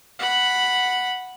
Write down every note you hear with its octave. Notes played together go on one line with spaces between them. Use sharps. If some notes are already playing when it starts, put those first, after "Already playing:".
F#5 B5